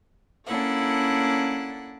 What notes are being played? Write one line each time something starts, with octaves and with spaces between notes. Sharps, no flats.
A#3 C#4 D4 E4 A4 F#5